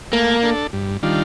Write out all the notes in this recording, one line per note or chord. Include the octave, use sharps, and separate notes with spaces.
A3 A#3
D4 A4
G2
D#3 G3 D4 F4